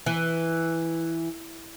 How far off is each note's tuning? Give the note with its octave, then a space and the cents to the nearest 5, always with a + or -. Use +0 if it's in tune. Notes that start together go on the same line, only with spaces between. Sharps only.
E3 +0